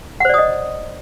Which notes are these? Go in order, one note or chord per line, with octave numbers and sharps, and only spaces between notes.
C5 D5 D#5 F#5 D#6